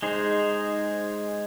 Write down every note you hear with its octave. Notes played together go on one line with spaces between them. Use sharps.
G#3 D#4 G#4 C5